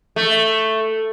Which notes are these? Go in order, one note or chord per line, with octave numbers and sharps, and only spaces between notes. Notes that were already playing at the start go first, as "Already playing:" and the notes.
A3